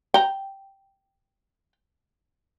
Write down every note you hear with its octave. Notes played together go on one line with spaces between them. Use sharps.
G5 A#5